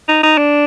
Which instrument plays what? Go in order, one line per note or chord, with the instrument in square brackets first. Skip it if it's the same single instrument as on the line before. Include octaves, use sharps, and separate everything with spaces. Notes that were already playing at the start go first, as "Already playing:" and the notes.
[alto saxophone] D#4
D#4
D4